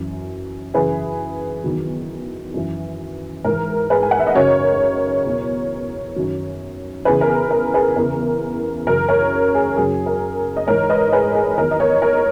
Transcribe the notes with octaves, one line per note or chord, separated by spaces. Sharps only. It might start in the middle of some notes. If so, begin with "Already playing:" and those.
Already playing: F#2 E3
F#2 C#3 E3 G#4 B4
E2 D#3 F#3
F#2 E3
G#2 E3 A#4
G#4 B4
G#5
F#5
E5
D#5
F#2 C#3 F#3 A#4 C#5
E2 B2 F#3
F#2 D#3 F#3
E2 C#3 E3 G#4 B4
A#4
G#4
A#4
G#4 B4
E2 C#3 E3 A#4
F#2 C#3 E3 A#4
A#4 C#5
G#4
F#2 C#3 F#3 G#4
A#4
D#5
G#2 E3 A#4 C#5
B4 D#5
G#4 B4
G#4
E2 D#3 F#3 A#4
D#5
A#4 C#5
A#4